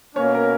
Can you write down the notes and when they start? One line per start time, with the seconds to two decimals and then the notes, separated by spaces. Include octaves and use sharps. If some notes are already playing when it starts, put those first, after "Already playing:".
0.15 B2 A#3 C#4 C#5
0.35 A#4